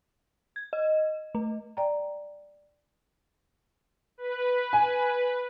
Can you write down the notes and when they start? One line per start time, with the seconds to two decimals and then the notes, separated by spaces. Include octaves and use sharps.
0.56 G#6
0.73 D#5
1.35 A3
1.77 D5 G5 A#5
4.18 B4
4.73 G#5